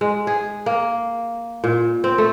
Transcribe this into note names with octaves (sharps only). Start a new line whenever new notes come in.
G#3
G#4
A#3
A#2
C4
A3